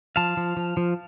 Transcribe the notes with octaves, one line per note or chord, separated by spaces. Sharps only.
F3 F5 A5
F3
F3
F3